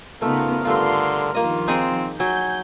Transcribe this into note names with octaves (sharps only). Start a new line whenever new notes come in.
C#3 A3 B3 D#4 F4 A#4
G2 D3 A3 F4 C6
D#3 F3 A#3 F4 D#5
C4 D#4 G#4 D#5
F#3 G#5 G6